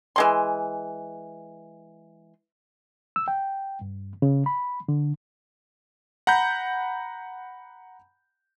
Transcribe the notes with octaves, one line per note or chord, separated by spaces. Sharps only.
E3 G#3 C6
E6
G5
G2
C#3
B5
D3
F#5 A#5 B5 G6